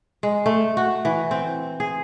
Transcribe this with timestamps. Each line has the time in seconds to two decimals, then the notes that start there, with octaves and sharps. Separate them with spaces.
0.23 G#3
0.46 A3
0.77 F#4
1.05 E3
1.31 C4
1.80 G#4